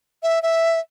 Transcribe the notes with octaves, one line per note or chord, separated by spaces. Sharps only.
E5
E5